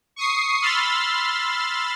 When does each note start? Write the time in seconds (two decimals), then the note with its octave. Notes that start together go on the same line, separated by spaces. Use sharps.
0.16 C#6 D#6 C7
0.62 B5 C6 E6 F6 A6